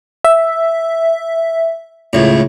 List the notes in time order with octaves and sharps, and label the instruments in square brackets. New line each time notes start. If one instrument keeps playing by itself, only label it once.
[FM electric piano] E5
[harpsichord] C#2 A2